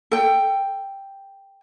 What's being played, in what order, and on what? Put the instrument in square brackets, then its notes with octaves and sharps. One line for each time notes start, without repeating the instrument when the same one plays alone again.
[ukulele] A4 G5